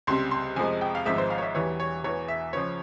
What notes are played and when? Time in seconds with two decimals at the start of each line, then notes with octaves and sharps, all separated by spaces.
0.07 C#2 C3 G3 C6
0.31 C6
0.56 F2 C3 F3 G#3 G#5
0.81 G5
0.95 F5
1.05 G#1 G#2 F3 G#3 E5
1.18 C5
1.30 F5
1.38 C#5
1.42 E5
1.55 E1 E2 E3 G3 C#5
1.80 C#5
2.03 E1 E2 E3 C#5
2.28 E5
2.53 C#2 C#3 F3 C#5